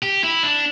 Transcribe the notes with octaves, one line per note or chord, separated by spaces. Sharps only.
G4
E4
D4